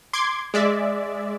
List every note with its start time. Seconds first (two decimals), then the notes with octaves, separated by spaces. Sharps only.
0.13 C6 D6 G#6
0.54 G#3 D5 E5